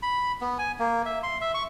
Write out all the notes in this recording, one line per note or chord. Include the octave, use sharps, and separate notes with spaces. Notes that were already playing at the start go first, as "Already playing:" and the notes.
B5
B3
G#5
A#3
E5
C6
E5
C#6